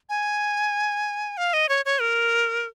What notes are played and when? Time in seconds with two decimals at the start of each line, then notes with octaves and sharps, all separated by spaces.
0.09 G#5
1.37 F5
1.53 D#5
1.69 C#5
1.85 C#5
2.01 A#4